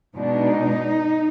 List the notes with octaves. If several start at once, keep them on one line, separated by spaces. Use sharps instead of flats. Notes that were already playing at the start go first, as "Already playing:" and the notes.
B2 G#3 D4 D#4